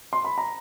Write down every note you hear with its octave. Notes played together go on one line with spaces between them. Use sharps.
C6
B5
A#5